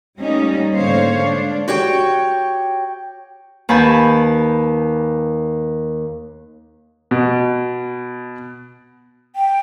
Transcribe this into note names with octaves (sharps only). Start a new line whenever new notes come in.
G3 A3 A#3 C#4 D#4
G#2 D3 A#3 C5 C#5 F5
D4
F#4 G4 C#5 G5
D#2 B4 G#5 A5 B5 G6
B2
G5